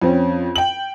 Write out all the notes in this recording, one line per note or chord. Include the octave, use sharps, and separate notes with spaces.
F2 C4 C#4
G5 F#7